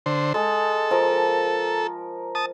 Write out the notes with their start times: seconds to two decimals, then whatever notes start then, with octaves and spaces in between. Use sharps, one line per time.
0.06 D3 C5
0.34 G#3 A4
0.91 F3 A#4
2.35 A5 D#6